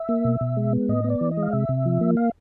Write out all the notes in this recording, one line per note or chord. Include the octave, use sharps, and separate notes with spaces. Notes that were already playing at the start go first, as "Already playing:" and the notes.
Already playing: E5
A#3
B2
B2
G#3
B3
A2 D#5
B3
D5
E3
D#5
G#3
F5
C3 E5
C3
F3
A#3
F5